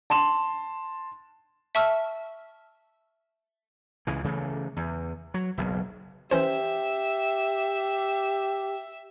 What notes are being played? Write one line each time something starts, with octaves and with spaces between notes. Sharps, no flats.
A5 C6 E7
E5 A5 C#6 E6 F6
C#2 C#3 E3
C#3 E3 A3
E2
F#3
F#1 B1
E3 C#4 G4 C5 E5